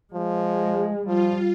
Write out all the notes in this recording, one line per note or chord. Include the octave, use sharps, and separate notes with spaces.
F3 G#3
F3 G3 F4